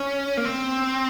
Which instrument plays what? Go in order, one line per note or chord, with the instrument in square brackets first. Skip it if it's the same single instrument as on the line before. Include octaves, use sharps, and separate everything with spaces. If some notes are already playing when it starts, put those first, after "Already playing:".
Already playing: [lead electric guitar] C#4
A#3
C4